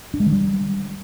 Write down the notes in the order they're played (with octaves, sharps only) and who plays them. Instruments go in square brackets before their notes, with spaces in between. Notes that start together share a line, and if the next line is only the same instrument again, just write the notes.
[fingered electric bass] D4
G#3
D#3
G3